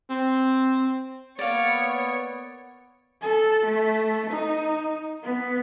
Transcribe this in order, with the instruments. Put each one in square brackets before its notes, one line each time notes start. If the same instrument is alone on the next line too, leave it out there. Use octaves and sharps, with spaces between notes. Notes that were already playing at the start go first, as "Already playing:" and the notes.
[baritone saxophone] C4
[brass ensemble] A#3 B3 [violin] C#5 [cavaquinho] D5 F5
[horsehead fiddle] A4
A3
D#4
B3